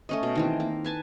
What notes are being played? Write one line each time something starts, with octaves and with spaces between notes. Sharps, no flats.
A3 C#4 D#5
B2
D#3 E3 C4
A#3
B4 G#5 A5